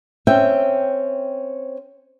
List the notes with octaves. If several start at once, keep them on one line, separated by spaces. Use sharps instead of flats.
C4 C#4 E5 G5